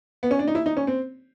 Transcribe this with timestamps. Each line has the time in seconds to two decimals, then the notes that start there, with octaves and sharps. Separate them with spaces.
0.23 B3
0.31 C#4
0.39 D4
0.48 D#4
0.55 E4
0.66 D#4
0.77 C#4
0.87 C4